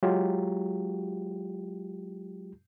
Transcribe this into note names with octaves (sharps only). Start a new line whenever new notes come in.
F#3 G#3 F4 G4